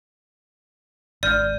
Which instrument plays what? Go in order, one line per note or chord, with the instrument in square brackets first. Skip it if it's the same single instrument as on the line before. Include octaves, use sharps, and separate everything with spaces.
[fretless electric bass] G#1 [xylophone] D5 [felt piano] F6 G6 D#7